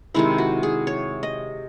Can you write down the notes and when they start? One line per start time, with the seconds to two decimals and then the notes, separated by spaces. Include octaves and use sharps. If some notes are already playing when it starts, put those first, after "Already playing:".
0.14 C3 D#3 G#3 C4 E4
0.38 F#4
0.63 G#4
0.87 C#5
1.23 D#5